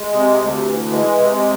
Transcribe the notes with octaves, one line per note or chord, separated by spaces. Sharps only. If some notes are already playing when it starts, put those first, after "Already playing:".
Already playing: G#3
C3
D2
E3
G#3
C3